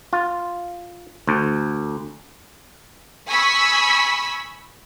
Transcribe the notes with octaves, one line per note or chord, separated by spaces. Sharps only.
F4
D2
G#5 B5 C#6 D#6 E6